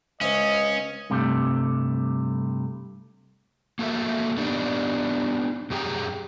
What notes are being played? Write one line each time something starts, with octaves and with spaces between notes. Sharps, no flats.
C#2 C#4 C5 D#5 E5
G2 C3 G3 A3
A#3 F#4 A4 A#4 E5
B3 D4 D#4 G4
F#2 G4 G#4 G5 A#5